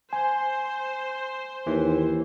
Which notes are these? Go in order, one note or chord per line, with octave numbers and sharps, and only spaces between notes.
C5 G#5
D#2 E3